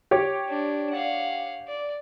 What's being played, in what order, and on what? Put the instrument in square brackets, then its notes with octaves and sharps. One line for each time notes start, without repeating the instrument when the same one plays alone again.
[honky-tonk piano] G4 C#5
[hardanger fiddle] D4
F5 F#5
D5